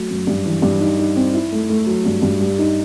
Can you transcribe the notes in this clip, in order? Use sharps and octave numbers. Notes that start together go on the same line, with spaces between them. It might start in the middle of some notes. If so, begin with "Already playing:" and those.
Already playing: F#3 A3
F#2
G2
E3
G2
D#4
D#4
C4
E4
A3
A3
F#3
G2
G2
G3
D#4